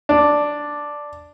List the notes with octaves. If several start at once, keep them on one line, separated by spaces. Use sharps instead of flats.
D4